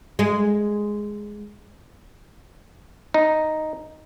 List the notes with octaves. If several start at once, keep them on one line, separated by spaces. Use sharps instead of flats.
G#3
D#4